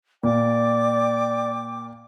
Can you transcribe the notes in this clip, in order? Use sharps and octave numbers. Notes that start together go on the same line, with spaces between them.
A#2 D5 G5 D6